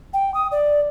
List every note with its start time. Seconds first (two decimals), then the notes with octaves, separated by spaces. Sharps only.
0.13 G5
0.34 D#6
0.52 D5